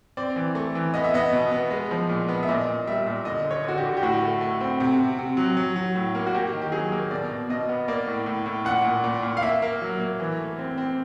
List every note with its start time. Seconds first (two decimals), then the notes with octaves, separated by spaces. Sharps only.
0.17 C4 D5
0.36 E3
0.55 A3
0.75 E3
0.94 B3 D#5
1.04 E5
1.14 B3 D#5
1.33 B2
1.51 B3
1.71 G#3
1.91 F3
2.09 A#2
2.29 B3
2.43 E5
2.49 A#2 D#5
2.68 A#2
2.87 G3 E5
3.07 A#2
3.25 D3 D#5
3.45 D3
3.51 C#5
3.64 D3 F#4
3.78 G4
3.83 D3
3.97 G4
4.03 A2 F#4
4.22 A3
4.41 A3
4.61 C4
4.80 C3
4.99 C3
5.19 C3
5.37 F#3
5.57 F#3
5.76 F#3
5.95 A2
6.15 A#3
6.26 F#4
6.34 A#3 G4
6.53 D#3
6.62 G4
6.72 F#3 G#4
6.92 A#3
7.11 B2 D5
7.30 B2
7.49 B2 D#5
7.69 B3
7.88 A#3 D5
8.07 A2
8.26 A2
8.46 A2
8.65 A#2 F#5
8.85 A#2
9.04 A#2
9.23 A#2
9.37 F5
9.42 A#3 E5
9.62 A#3
9.82 F#3
10.00 A#3
10.20 E3
10.39 A3
10.59 C4
10.78 C4